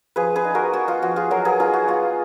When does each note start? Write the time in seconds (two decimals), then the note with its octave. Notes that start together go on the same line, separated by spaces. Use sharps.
0.16 F3 G#4 B4
0.36 G#4 B4
0.45 D#4
0.55 F#4 A#4
0.73 B3 F#4
0.88 F4
1.02 F3 F#4
1.16 F4 G#4
1.31 F#3 F#4 A#4
1.45 G#4 B4
1.59 D#4 F4 G#4
1.73 F#4
1.88 B3 F4